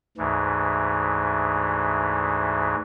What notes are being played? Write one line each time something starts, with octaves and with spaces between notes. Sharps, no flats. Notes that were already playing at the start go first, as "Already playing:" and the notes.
D2 G#2 E3